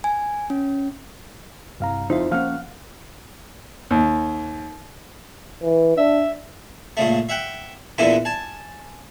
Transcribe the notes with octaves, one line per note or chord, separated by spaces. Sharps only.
G#5
C#4
C2 G2 F5 A#5
F2 D#4 E4 C5 F5
F3 A#3 C#4 F5 F#5 F6
D#2
E3
D4 E5
A#2 C#3 A3
E5 F#5 G5
E2 A#2 D3 E3 E4
G#5 A5